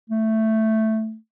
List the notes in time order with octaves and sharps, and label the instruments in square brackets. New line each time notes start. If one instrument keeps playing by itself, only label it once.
[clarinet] A3